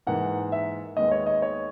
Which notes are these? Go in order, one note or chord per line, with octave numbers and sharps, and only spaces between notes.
G#2 E3 A#3 F#5
E5
D#2 D#3 G#3 B3 D#5
C#5
D#5
C#5